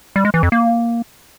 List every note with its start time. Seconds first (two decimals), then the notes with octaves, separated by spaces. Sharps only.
0.16 G3
0.25 G#3
0.34 E3
0.43 F2
0.52 A#3